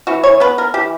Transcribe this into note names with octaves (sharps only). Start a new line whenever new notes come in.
E3 F#4
C#5
B3 B4
A#4
E3 G4